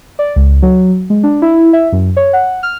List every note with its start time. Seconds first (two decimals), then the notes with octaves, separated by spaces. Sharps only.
0.19 D5
0.36 C#2
0.62 F#3
1.10 G#3
1.23 D4
1.42 E4
1.73 E5
1.92 F#2
2.17 C#5
2.33 F#5
2.63 F6